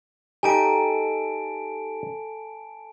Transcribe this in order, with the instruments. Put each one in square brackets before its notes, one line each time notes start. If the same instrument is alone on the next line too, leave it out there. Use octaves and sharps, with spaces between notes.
[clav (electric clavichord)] D#4 G4 [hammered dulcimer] A4 B5 [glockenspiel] G#5 A5 D7